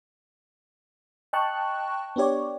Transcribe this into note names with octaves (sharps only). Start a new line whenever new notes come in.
D#5 G5 A5 C#6 F#6
B3 D4 G4 C#5 D5